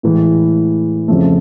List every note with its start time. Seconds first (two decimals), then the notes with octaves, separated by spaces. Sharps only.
0.03 A2 E3 G#3
1.08 F2 C#3 F3 A3